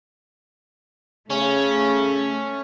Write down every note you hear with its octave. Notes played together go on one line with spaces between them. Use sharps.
C#3 A3 C#4